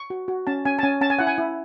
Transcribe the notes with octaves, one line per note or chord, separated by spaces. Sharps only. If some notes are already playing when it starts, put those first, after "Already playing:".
Already playing: C#6
F#4
F#4
C#4 A5
C#4 G#5
A5
C#4 G#5
C#4 A5
G#5
E4 F#5
G#5
E4